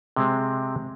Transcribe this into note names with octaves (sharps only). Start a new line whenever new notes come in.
C3 G#3 C4